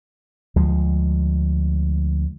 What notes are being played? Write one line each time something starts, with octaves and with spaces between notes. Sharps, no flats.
D2 F3 G#3